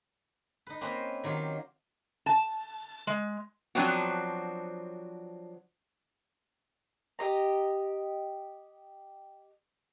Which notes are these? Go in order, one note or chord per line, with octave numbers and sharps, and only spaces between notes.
D#4 B4
A#3 C4 C#4 B4 C5 D#5
D#3 F#3 F4 G4 A#4
A5
G#3
F3 F#3 B3 C4 D4 F#4
G4 D#5 A#5